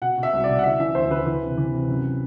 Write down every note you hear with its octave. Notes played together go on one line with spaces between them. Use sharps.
B2 F#5
B2
E5
C2
D5
B2
F#5
E3 E5
E3 E5
D2 C5
E3 B4
E3
C3
E3
C3
F#2